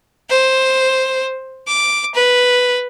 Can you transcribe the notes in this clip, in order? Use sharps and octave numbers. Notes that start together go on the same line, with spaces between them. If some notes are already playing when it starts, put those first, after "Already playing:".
C5
D6
B4